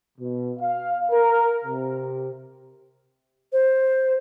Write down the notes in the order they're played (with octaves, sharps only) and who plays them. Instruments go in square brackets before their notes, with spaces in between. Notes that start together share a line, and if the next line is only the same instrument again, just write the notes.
[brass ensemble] B2
F5
A#4
C3
[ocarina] C5